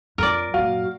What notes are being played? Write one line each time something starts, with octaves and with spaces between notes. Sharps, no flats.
F2 A#4 D5
F#2 A#2 F#4 F5